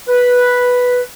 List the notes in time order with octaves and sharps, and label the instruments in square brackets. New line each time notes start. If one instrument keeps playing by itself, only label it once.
[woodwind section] B4